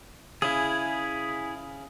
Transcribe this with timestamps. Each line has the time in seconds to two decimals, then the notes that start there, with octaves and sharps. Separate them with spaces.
0.42 C#3 E4 G#4